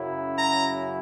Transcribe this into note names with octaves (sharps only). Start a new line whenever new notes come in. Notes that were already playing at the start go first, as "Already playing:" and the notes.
Already playing: F#2 C#3 F#3 C#4 E4
A#5